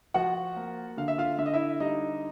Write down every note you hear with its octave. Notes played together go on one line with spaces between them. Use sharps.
F3 F#4 F#5
A#3
D3 F5
E5
F4 F5
D3 E5
D#5
E4 E5
G3 D#4 D#5